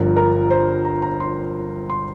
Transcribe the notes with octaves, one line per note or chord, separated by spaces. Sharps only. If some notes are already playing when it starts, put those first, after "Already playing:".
Already playing: G1 G2 F3 A#4
A#4
C5
A#5
A#5
C6
C6